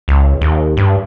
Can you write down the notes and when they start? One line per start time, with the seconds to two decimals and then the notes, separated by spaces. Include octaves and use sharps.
0.08 C#2
0.41 D#2
0.77 G2